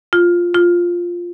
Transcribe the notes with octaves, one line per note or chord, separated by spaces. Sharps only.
F4
F4